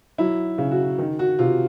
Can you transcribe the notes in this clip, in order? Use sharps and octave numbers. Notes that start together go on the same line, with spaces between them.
F#3 E4
C#3
F#4
D#3
F#4
C3 F4